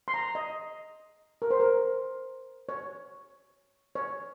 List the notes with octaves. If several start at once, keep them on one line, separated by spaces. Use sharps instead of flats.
C6
A#5
D#5
A#4
C5
A#4
C#5
C#5